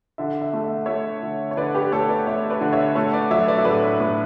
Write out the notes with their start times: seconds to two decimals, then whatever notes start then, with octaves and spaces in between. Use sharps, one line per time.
0.18 D3 E5
0.42 E5
0.53 A3
0.64 E5
0.86 A3 C#5 E5
1.23 D3
1.51 C#5
1.57 D3 B4 D5
1.75 G4 B4
1.92 A3 A4 C#5
2.09 B4 D5
2.27 A3 C#5 E5
2.50 B4 D5
2.61 D3
2.72 C#5 E5
2.95 A3 A4 C#5
3.13 B4 D5
3.30 F#3 C#5 E5
3.47 B4 D5
3.58 E5
3.65 A2 B4 D5
4.00 A2